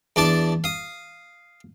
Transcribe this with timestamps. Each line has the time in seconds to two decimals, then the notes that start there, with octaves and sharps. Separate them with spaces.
0.16 E2 D4 D5 A5
0.64 F5 D#6